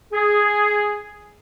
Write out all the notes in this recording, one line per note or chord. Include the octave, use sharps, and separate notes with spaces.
G#4